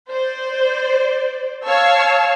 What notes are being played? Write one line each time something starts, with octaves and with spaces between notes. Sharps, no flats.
C5 D5
C#5 F5 A5 C#6 E6 C7